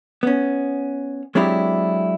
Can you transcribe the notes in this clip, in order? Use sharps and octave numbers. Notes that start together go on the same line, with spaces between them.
B3 C#4
F#3 G#3 C4 D4 E4 G4